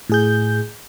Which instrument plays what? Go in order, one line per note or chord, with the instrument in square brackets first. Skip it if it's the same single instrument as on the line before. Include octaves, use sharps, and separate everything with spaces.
[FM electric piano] A2 G#4 G6